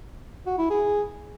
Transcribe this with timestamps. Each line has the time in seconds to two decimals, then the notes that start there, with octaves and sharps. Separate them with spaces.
0.46 F#4
0.58 E4
0.70 G#4